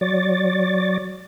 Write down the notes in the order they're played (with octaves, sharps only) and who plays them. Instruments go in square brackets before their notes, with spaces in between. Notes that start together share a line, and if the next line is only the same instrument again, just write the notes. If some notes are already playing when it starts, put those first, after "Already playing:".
[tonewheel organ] F#3 C#5 D5 A6